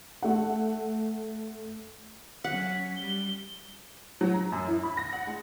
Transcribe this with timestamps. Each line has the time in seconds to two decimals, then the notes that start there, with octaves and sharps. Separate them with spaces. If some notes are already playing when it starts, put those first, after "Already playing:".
0.22 A3 F#5
2.44 F#3 C#4 F#5 B6
2.96 G3 G7
4.21 F#3
4.34 A#5
4.52 F#2
4.68 E4
4.83 B5
4.97 A#6
5.13 F#5
5.27 G#3